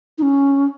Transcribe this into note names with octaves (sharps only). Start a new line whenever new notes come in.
D#4
C#4